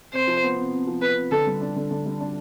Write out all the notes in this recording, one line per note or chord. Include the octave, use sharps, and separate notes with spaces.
C3 C5
F3
B3
C3
C3
F3
B3 B4
C3
D3 A4
G3
D4
D3
D3
G3
D4